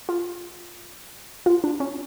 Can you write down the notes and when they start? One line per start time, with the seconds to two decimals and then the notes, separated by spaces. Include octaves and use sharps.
0.09 F4
1.46 F4
1.64 D4
1.80 C#4